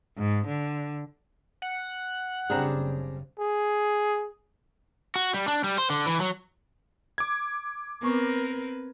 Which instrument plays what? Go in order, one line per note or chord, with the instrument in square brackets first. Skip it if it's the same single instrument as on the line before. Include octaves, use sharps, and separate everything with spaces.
[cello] G#2
D3
[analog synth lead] F#5
[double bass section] F#1 C#3 [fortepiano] G3 D4 A#5 [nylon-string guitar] C4 G#4
[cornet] G#4
[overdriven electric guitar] F#4
G3
D4
G3
C5
D3
E3
F#3
[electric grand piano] D6 G#6
[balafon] B3 C#6 [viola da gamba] C4 A#4 B4